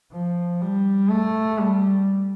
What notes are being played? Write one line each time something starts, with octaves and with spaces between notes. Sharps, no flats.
F3
G3
A3
G3